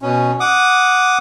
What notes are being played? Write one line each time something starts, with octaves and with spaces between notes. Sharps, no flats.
B2 C#4
F#5 D6 D#6